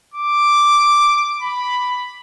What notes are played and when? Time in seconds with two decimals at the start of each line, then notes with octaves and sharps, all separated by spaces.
0.14 D6
1.42 B5